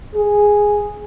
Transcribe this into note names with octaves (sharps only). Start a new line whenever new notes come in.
G#4